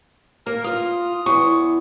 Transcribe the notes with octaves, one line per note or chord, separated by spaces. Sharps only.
A#3 A#4
F4 D#6
E2 C#6